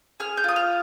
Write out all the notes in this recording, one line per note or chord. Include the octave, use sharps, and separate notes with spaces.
G#4 F6
G6
F4 D#6
F6